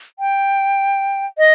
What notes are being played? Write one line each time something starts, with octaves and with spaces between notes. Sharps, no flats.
G5
D#5